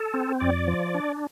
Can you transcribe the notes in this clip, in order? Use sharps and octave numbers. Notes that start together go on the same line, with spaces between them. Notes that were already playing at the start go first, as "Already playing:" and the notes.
Already playing: A4
C4
F2 D5
F3
D4